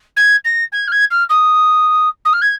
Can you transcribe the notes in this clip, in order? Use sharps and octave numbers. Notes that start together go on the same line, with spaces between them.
G#6
A#6
G#6
F6
G#6
F6
D#6
D#6
F6
G#6